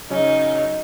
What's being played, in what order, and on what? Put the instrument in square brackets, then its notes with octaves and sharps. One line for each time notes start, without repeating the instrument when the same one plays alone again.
[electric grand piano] C#3 F#3 C#4 [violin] D#4